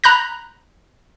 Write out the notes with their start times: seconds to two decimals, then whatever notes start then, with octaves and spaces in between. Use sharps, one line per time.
0.04 A#5 B5 F#6 G6 A#6